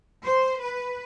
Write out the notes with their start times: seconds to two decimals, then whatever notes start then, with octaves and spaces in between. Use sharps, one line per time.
0.23 C5
0.60 B4